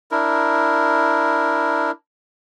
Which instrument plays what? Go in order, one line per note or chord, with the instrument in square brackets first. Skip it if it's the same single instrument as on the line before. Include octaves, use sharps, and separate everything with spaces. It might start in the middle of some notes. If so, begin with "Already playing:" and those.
[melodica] D4 E4 A#4